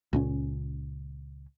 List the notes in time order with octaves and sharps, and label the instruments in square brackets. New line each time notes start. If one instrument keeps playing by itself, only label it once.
[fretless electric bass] C#2 A#2 C#4